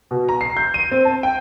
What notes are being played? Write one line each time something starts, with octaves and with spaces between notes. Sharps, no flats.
B2
A#5
C7
G6
D#7
C4
A5
G5